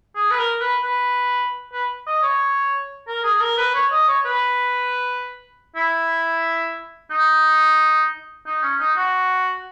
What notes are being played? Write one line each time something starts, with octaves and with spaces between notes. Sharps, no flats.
G#4
B4
A#4
B4
B4
B4
D#5
C#5
A#4
G#4
G#4
A#4
B4
C#5
D#5
C#5
B4
E4
D#4
D#4
C#4
D#4
F#4